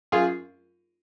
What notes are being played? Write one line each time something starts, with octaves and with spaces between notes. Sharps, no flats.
F#2 F4 G#4